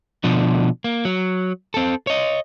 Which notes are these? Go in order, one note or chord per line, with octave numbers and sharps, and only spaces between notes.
B2 D3 F3 D4
A#3
F#3
C4 A4
C#5 D#5